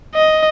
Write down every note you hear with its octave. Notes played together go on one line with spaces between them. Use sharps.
D#5